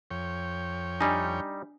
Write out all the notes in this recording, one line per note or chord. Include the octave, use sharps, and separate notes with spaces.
F2 C#5 G5
G3 D4 D#4